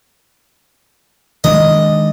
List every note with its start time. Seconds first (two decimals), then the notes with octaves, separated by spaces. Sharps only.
1.44 D#3 G#3 D4 D#5